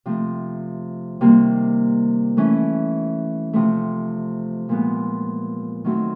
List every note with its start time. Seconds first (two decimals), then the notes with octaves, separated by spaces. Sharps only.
0.06 C3 F3 A3
1.21 C3 D#3 G3 A#3
2.37 E3 A3 C#4
3.53 C3 F3 A3
4.69 A#2 F3 G#3 B3
5.84 D#3 F#3 A3 C4